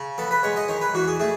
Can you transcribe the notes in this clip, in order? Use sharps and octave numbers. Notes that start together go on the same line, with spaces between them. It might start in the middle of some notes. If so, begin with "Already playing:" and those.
Already playing: C#3
B3 A4
B4
G#3 C#5
D#5
D#3 C#5
B4
E2 F#4
G#4
A3 G#4